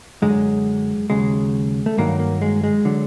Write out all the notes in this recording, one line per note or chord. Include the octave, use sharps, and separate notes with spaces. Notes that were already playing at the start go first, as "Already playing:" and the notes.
F#2 D3 F#3 G#3
D#2 C#3 F#3 G#3
A3
G2 D#3 F#3 A#3
A#3
G#3
G#3
D3 F#3